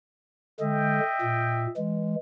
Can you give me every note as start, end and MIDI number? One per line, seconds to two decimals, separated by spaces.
0.60 1.00 50
0.60 1.00 56
0.60 1.71 75
0.60 1.71 76
0.60 1.71 79
1.22 1.67 46
1.77 2.16 52
1.77 2.16 56